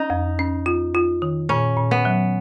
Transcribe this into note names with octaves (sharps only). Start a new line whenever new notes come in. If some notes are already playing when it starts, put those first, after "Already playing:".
Already playing: C#4 D#4
F2
C#4
F4
F4
D#3
A#2 C#4
A#2
B3
F#3